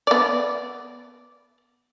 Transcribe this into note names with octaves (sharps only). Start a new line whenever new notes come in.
B3 D5